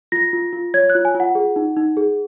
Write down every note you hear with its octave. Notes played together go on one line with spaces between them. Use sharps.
F4 A#6
F4
F4
C#5 G#6
F#6
F4
G#5
F4
F#5
G#4
D#4
D#4
G#4